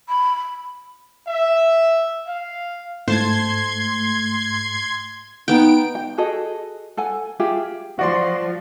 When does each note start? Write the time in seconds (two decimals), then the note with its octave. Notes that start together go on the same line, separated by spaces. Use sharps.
0.09 B5
1.28 E5
2.27 F5
3.08 G#2 A3 C5 A5 C6 G#6
5.48 B3 D#4 G5 D7
5.95 G5
6.18 F#4 G#4 A4 D#5
6.97 A4 F#5 G#5
7.40 F4 G4 G#4 E5
7.99 F3 F#4 D5 C6